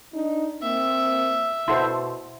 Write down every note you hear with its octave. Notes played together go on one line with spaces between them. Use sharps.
D4 D#4
A#3 C4 E5
B2 E4 A4 C5 F#5 C6